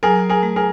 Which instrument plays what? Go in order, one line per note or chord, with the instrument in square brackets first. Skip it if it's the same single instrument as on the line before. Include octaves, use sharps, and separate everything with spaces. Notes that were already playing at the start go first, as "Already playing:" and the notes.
[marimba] F#3 [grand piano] G#4 A#4
[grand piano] G#4 A#4
[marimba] A3
[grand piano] G#4 A#4